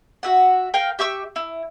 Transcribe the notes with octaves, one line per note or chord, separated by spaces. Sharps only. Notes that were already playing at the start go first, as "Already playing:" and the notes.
F#4 E5 F#5
A#4 F5 G5
G4 E5 C#6 E6
E4